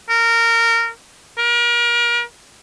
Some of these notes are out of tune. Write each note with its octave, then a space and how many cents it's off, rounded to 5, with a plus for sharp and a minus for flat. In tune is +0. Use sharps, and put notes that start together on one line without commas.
A#4 -20
A#4 +35